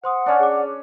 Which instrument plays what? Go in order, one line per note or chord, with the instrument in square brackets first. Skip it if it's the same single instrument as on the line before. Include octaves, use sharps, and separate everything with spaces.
[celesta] C5 C6 D#6 [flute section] F#5
[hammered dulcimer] C#4 D4 [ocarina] D5
[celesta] G#4 D6